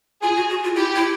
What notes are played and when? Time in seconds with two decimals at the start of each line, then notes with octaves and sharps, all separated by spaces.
0.22 F4 G#4
0.37 F#4
0.50 F#4
0.64 F4
0.76 E4 G4
0.96 E4